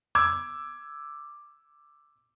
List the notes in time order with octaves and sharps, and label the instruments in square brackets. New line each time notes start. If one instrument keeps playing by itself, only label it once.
[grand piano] D6 E6 G#6